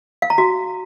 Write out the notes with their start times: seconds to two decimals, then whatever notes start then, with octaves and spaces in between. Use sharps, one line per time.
0.22 F5
0.30 A#5
0.38 F#4